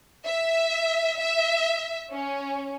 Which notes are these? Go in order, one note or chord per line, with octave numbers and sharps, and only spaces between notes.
E5
E5
C#4